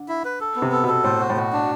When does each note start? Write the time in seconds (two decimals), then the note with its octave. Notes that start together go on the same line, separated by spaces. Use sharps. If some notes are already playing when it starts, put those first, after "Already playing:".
Already playing: D3
0.08 E4
0.25 B4
0.40 A4
0.56 B3
0.62 C3
0.72 A4
0.84 B2 A4
1.04 A2 C5
1.20 F#4
1.30 A2
1.36 B2 F#4
1.53 D4